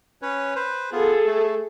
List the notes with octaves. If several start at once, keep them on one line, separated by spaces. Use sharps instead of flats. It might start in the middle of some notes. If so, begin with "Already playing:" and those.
C#4 B4 C#5
B4 C5
B3 F4 G#4 A4
A3